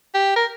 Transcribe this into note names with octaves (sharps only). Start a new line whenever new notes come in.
G4
A#4